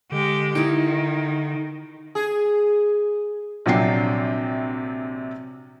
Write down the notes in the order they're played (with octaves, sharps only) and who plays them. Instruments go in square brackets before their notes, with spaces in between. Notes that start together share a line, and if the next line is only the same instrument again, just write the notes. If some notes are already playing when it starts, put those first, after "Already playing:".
[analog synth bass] D3 [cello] G#3 G4
[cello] D#3 [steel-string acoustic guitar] D#4 E4
[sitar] G#4
[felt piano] A#1 C3 F#3 D4 G5 C7